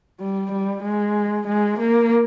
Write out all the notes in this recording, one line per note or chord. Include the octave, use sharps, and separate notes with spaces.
G3
G3
G#3
G#3
A#3